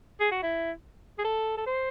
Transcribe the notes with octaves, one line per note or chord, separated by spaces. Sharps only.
G#4
F#4
E4
G#4
A4
A4
C5